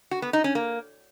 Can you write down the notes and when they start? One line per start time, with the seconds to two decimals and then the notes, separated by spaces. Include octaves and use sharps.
0.11 F#4
0.22 B3
0.33 D#4
0.44 C#4
0.55 A#3